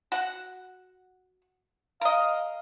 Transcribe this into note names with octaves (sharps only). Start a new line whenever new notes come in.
F#4 F#5
A#4 D#5 F5